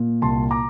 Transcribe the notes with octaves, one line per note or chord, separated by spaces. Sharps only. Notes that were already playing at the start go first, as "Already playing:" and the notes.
Already playing: A#2
C2 A5 C6
A#5 D6